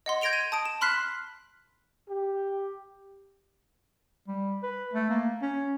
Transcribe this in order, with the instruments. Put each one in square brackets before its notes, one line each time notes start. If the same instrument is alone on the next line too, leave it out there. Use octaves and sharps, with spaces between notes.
[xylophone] D#5 F#5 C6
G6 G#6 A#6 D7 F7 G7
D#7
A5 D#6 D7
E7
B5 C6 F6 F#6 B6 C7
[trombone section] G4
[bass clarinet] G3
B4
A3
A#3
C#4